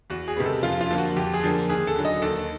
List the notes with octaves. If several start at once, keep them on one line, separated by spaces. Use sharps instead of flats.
E2 F#4
G#4
C3 D#3 G3 B3
A4
F2 F4
F4
D3 F3 A#3
F#4
F2 G4
G#4
D3 F3 A#3
D#2 G#4
A4
D3 F#3
D#5
D#2 A4